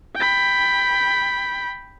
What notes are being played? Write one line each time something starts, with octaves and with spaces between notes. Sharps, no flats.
G5 B5